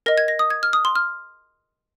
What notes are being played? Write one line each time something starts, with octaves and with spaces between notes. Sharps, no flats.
A#4 D#5 A#6
G#6
A#6
D#6
G#6
F6
D#6
C6
F6